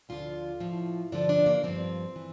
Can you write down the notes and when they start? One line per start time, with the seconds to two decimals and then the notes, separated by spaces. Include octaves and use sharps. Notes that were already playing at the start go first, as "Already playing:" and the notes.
0.09 D2 D3 F3 F4
0.60 A2 F3
1.12 G2 D3 F3 D4
1.29 D4
1.46 A#3
1.63 G2 F3 C4
2.16 E3